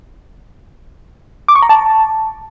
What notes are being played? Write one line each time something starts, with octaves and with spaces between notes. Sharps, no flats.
D6
C#6
A#5
A5